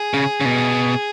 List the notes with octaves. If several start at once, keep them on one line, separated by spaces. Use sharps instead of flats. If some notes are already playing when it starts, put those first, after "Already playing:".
Already playing: G#4
C#3
C#3
B2